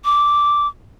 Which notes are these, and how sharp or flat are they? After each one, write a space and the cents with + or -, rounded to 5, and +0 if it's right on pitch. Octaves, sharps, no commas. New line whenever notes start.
D6 -5